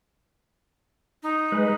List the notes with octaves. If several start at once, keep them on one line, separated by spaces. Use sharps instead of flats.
D#4
G#3 B4